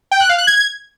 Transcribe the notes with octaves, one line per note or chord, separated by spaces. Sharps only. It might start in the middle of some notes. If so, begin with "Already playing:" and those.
G5
F#6
F5
F#6
G#6